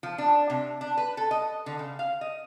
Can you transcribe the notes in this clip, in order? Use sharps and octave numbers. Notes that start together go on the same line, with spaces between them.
F3
D4
C3
D4
B4
A4
D#5
D3
C#3
F5
D#5